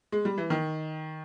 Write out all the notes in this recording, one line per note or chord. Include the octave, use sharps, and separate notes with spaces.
G#3
G3
E3
D#3